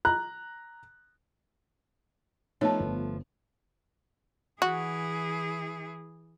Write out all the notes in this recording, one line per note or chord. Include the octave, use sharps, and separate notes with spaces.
A#5 F#6
F3 A3 B3 D#4 C#5 A5
G1
E3 F#4 G#4